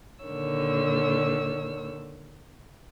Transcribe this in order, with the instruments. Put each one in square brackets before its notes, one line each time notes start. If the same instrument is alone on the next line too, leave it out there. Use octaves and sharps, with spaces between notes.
[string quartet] A#2 D3 D#3 C#5 E6